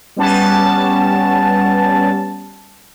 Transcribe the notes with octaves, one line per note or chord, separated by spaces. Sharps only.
G3 B3 C#4 A5